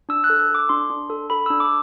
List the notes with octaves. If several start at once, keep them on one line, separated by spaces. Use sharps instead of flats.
D4 E6
F#6
A4
E6
A4
D6
D4 C6
D4
A4
A4 B5
D4 E6
D6